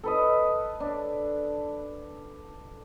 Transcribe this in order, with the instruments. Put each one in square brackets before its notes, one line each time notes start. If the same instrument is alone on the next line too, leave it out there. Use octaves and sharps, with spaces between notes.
[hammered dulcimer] A4 B4 D#5
D4